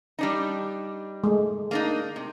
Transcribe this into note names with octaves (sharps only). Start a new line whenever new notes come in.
G3 D4 D#4
G#3 A3
A#3 D4 D#4
C3